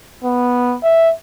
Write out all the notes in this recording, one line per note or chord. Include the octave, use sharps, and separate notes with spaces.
B3
E5